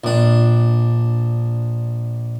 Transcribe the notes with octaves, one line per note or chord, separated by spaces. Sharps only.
A#1 D4